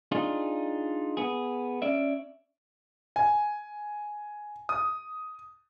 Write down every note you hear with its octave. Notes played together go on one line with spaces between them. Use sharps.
D4 D#4 F4 G#4
B3 G#4
C#4 D5 E5
G#5
D#6